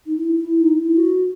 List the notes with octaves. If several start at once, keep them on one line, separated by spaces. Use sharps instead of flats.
D#4
E4
E4
E4
D#4
E4
F#4